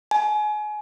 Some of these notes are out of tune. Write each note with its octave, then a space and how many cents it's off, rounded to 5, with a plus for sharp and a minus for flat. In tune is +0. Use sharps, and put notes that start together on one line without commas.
G#5 +30